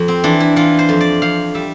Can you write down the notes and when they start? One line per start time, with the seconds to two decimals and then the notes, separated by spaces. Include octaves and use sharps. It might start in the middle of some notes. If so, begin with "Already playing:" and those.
Already playing: F2
0.08 C4
0.24 E3 D4
0.40 E4
0.56 E3 F4
0.79 C5
0.89 F2
1.01 D5
1.22 F2 F5
1.55 G3 E5